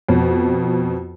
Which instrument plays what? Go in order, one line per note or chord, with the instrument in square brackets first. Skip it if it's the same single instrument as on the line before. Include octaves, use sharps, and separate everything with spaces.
[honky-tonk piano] F2 B2